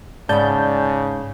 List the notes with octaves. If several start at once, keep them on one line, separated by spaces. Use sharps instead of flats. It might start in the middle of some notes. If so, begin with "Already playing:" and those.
G#2 C#3 D5 A5 B5 G6